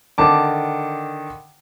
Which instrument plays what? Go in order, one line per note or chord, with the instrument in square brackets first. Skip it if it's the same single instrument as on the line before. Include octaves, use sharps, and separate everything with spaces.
[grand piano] D3 D#3 A5 D6